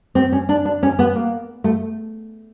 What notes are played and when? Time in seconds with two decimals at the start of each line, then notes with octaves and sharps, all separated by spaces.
0.15 C4
0.32 C#4
0.49 D4
0.65 D4
0.83 C#4
0.99 B3
1.15 A#3
1.64 A3